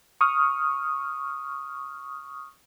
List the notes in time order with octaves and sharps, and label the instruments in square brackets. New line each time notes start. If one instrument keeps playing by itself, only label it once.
[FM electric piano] C#6 D#6 F6